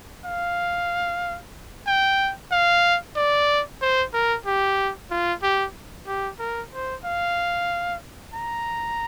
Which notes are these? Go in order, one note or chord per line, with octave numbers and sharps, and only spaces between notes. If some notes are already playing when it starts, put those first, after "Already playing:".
F5
G5
F5
D5
C5
A#4
G4
F4
G4
G4
A#4
C5
F5
A#5